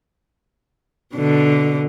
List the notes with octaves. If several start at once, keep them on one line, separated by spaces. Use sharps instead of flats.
B2 D3